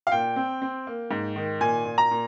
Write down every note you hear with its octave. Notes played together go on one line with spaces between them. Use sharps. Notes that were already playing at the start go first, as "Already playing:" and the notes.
F5
A#2 G5
C4
C4
A#3
G#2
D#3
A#2 G#5
A#2
A#5
A#2